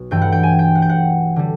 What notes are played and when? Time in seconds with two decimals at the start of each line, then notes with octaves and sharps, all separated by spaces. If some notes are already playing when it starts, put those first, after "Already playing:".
Already playing: B1
0.11 G2 E3 A3 G5
0.22 F#5
0.32 G5
0.43 G#5
0.59 G5
0.75 F#5
0.82 G5
0.89 F#5
1.36 D3 G3